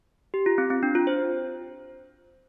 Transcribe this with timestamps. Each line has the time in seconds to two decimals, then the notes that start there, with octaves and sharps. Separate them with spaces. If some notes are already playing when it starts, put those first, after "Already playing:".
0.34 G4
0.46 F4
0.58 C4
0.70 C4
0.83 D4
0.95 F4
1.07 C5